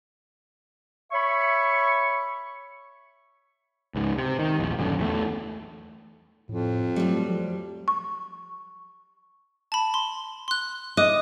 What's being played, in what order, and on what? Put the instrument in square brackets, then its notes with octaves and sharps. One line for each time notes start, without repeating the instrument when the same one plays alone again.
[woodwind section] C#5 E5 B5 C#6
[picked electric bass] C#2 G#2
C3
D#3
A#1 E2
D#1 F#2 D3
E2 F3 A3
[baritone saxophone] F2 [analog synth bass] A2
[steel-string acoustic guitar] F#3 G3 [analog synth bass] A3
[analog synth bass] F3
[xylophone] C#6
A5 B5
C6
C6 F#6
[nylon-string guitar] D#5 [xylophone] D6 D#6 F#6